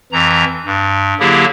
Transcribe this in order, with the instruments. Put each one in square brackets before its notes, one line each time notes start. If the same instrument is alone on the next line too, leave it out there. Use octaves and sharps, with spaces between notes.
[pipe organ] F2 E3 A#5
G2
D3 F#3 A#3 E4 G4 G#4